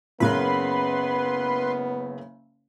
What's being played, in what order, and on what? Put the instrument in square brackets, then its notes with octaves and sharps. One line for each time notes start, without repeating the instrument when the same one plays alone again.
[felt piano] F#1 C#3 A#4 [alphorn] B3 [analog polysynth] B4 C6